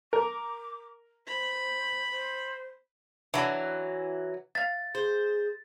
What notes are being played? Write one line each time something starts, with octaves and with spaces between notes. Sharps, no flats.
A#4 D6
C5 B5
C5
E3 F#3 D4 E4 F#4
E5 F5 A6
G#4 C5